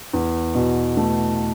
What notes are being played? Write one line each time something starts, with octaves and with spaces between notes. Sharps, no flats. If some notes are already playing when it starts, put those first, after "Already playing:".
E2
B2
A3